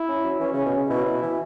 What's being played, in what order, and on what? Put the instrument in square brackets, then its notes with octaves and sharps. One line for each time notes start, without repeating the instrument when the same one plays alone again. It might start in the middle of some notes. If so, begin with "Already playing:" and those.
Already playing: [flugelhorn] E4
[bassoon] C#4
F#3
[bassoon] E3 [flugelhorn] C#4
[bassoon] C#3
B2
C#3
[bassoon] B2 [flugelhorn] E4
[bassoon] B2
E3